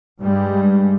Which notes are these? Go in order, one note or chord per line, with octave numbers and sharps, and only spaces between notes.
G2 G3 G#3